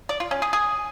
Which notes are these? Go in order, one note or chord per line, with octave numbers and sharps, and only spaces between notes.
D5
F4
C#4
G#4
G#4